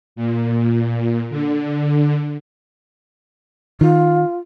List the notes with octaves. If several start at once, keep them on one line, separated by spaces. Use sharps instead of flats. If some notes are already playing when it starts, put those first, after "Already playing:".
A#2
D3
D#3 F4